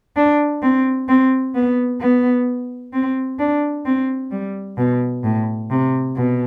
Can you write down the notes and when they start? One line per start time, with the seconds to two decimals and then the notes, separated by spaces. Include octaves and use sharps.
0.16 D4
0.62 C4
1.08 C4
1.55 B3
2.01 B3
2.93 C4
3.39 D4
3.85 C4
4.31 G3
4.77 B2
5.24 A2
5.70 C3
6.16 B2